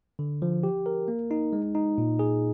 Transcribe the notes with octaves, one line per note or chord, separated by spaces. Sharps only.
D3
F3
G4
A#4
A#3
D#4
G#3
D#4
A#2
G#4